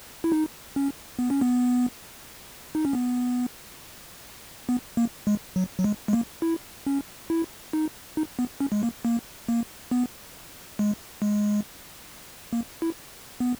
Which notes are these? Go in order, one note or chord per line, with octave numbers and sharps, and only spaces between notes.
E4
D#4
C#4
B3
C#4
B3
D#4
C#4
B3
B3
A#3
G#3
F#3
F#3
G#3
G#3
A#3
E4
C#4
E4
D#4
D#4
B3
C#4
G#3
A#3
A#3
A#3
B3
G#3
G#3
A#3
E4
B3